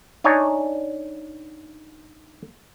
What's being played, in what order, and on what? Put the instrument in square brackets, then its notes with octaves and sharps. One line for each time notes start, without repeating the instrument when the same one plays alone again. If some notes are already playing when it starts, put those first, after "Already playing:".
[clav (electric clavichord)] D4 D#4 C#5 D#5 G#5